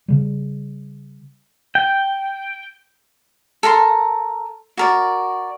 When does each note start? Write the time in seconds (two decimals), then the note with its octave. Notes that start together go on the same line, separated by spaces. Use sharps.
0.08 C#3 G3
1.75 G5
3.63 A4 A#4 A#5 C6
4.77 F#4 A#4 D5